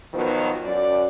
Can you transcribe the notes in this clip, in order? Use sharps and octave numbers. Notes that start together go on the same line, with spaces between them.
B2 D#3 F3 F#3 B3
F#2 D5